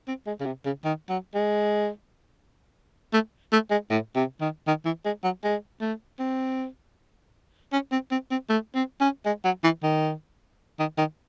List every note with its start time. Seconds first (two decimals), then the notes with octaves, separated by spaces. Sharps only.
0.08 C4
0.27 G#3
0.41 C#3
0.46 C3
0.65 C#3
0.85 D#3
1.10 F#3
1.35 G#3
3.13 A3
3.53 A3
3.71 G#3
3.90 A2
4.16 C3
4.41 D#3
4.67 D#3
4.85 E3
5.05 G#3
5.24 F#3
5.44 G#3
5.81 A3
6.19 C4
7.73 C#4
7.92 C4
8.12 C4
8.31 C4
8.50 A3
8.75 C4
9.01 C#4
9.26 G#3
9.45 F#3
9.64 E3
9.83 D#3
10.80 D#3
10.98 D#3